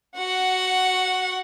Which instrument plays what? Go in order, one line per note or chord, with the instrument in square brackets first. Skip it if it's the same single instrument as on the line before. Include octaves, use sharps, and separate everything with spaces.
[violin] F#4 F#5